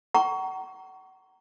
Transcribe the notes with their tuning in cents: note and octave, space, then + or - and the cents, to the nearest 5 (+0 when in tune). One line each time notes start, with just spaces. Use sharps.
F#5 +35 A#5 +0 C#6 +20